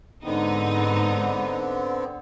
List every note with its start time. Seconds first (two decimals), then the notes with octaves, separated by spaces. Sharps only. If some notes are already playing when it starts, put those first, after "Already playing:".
0.24 G#2 D3 B3 C4 D#4 D#5